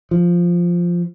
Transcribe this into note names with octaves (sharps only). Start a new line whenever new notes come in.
F3